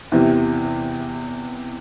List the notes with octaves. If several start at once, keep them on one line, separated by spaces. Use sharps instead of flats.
E2 C3 E3